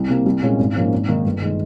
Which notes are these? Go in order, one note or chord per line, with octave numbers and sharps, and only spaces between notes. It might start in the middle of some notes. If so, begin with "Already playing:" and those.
Already playing: C2
C3 G3 A#3
C2
A#2 G#3 C#4
G#1
G#2 F3 A#3 C#4
G#1
G#2 D#3 A#3 D#4
G1
D#3 G#3